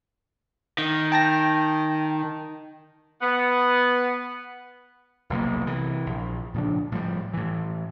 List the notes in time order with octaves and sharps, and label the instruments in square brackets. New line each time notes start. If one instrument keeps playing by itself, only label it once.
[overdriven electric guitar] D#3
[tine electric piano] G5 A5 A#6
[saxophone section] B3
[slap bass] F1 B1 F2 A#3
C3 E3
A#1
A#2 C#3 F3 D4
A2 F3 G3
A2 E3